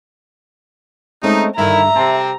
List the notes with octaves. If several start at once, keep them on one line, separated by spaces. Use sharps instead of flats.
G#3 A3 C4 C#4 D#4
G2 D3 D#3 E4 E5 A#5
C3 C4 A5